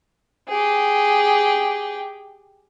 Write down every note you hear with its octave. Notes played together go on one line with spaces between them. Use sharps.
G4 G#4